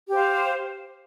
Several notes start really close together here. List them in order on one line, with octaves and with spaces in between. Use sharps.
G4 C5 F5